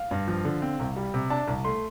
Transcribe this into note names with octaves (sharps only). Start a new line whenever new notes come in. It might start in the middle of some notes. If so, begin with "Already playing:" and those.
Already playing: F5
G2
F3
D3
C4
C2
G3
C3
D4 A5
C2
A3 C6